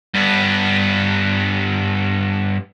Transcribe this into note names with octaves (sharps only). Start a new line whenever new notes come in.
G2 B3